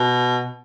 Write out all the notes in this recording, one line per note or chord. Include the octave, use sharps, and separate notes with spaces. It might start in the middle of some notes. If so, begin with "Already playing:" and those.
Already playing: B2